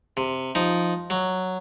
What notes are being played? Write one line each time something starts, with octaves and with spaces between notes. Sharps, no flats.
C3
F3 D#4
F#3